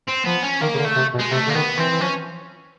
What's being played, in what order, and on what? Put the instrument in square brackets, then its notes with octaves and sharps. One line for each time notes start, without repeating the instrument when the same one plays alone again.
[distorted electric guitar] C4
[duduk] F3 [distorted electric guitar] B3
[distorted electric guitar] C#4
[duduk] D#3 [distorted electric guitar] A#3
[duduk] C#3
D3
[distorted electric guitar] A3
[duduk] C3
B2
[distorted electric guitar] G#3
[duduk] C3 [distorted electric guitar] A3
[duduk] D3 [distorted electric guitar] A#3
[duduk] D#3 [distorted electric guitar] B3
[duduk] E3 [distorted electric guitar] C4
[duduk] E3
[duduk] F3 [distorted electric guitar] C#4